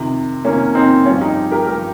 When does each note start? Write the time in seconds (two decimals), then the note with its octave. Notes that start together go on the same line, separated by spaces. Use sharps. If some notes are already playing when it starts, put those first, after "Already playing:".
Already playing: F2 C3 D#3
0.45 F2 C3 D#3 A#3 C#4
0.75 C4 D#4
1.06 G2 F3 C#4 F4
1.21 D#4 G4
1.52 G4 A#4
1.67 G2 F3 G4 A#4